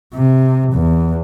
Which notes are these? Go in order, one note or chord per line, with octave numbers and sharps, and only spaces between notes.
C3
E2